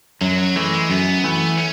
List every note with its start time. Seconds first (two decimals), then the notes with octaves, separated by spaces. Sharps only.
0.21 F#2 F#3
0.38 F#3
0.56 E3 G#3 A3
0.73 G#3
0.90 F#2 B3
1.24 E3 A3
1.58 C#4